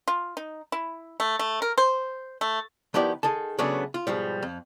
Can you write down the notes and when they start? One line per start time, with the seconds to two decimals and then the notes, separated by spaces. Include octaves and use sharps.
0.08 F4
0.37 D#4
0.72 E4
1.20 A3
1.39 A3
1.62 A#4
1.78 C5
2.41 A3
2.94 D#3 F3 B3 E4 G4 D5
3.23 D#3 G#4 A4 A5
3.58 C#3 F#3 A3 B3 D4 G#4
3.94 F4
4.07 G#2 B2 F3 G3
4.43 F2